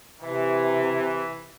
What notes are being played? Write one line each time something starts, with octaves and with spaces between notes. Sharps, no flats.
C3 E3